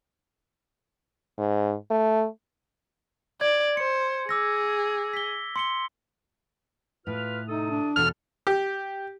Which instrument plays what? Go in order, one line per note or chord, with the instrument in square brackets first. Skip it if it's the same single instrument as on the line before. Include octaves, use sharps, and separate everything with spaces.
[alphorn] G#2
A3
[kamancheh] D5 [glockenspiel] G#6
[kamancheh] C5 [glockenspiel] C#7
[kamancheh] G#4 [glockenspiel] D6 E6 A#6
[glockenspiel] B6 G7
C6 C#7 G7
[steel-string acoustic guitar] A2 [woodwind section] F4 B4 F6
[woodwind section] C3 A4 D#6 [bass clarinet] D#4
[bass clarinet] D4
[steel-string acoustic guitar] E2 B2 [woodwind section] A4 [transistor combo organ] F6
[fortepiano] G4